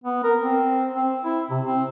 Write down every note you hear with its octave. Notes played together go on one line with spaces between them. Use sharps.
B3
A#4
C4
C4
E4
C3
C4